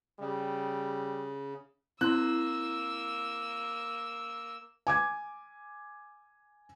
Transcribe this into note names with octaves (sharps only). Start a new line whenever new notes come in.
C#3 G3
A#3 C4 E4 C6 E6 F#6
G#5 D6 G#6